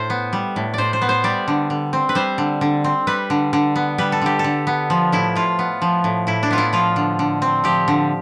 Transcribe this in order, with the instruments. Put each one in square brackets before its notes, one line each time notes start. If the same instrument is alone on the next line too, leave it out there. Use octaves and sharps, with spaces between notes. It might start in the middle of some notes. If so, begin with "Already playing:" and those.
Already playing: [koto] A2 C5
B3
G3
A2
A2 C5 D5
C5
B3
C5
G3 D5
D3
D3
C4
B4
G3 C5
D3
D3
C4
G3 B4
D3
D3
B3
G3 B4
A4
D3 G4
D3 A4
B3
F3
A2 E4
A2 F4
B3
F3
A2
A2 E4
D4
B3 F4
E4
F3 F4
D3
D3
C4
F3 G4
D3